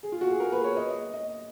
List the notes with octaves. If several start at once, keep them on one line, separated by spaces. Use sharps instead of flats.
G#4
F4
F#4
G#4
A#4
B4
C#5
D#5
D#5
D#5